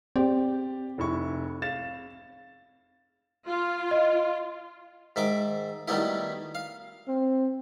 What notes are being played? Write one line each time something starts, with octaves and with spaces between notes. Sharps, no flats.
C4 G4 D5
F1 E4 C#6
F5 A6 E7
F4
D#5
G#2 D#3 E5 D6
D#3 F#3 G3 A3 B3 E4
F5
C4